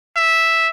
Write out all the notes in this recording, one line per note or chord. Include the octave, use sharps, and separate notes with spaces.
E5